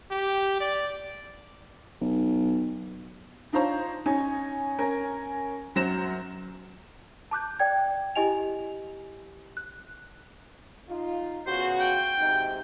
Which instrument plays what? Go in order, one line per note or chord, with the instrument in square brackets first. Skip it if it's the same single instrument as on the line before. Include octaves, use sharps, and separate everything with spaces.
[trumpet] G4
D5
[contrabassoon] B1
[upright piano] D4 D#4 F4 C5 C#5 A#5
C#4 D#4 C#5 G#5
C#4 A#4 G#5
F#2 F#3 C5 A#6 E7
[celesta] A5 D6 F#6 G6
D5 G5 G#6
E4 G4 D#5 G#5 F7
F#6
[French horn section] D#4 F4
[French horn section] C#3 B3 F#4 [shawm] C5
[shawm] G5
[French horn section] G#2 C3 D#4